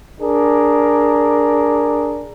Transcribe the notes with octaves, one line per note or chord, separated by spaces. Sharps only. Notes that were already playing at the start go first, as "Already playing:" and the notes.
D4 G#4 A#4